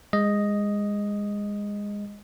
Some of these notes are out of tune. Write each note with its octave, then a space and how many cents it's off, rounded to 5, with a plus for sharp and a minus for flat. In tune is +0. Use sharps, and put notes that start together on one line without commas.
G#3 -20 D#5 +0